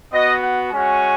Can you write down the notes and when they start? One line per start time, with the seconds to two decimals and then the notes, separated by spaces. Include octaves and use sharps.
0.12 B3 F#4 D#5
0.42 F#5
0.71 G#3 C#4 F#4 G#5